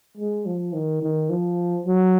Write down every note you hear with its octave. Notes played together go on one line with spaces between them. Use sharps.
G#3
F3
D#3
D#3
F3
F#3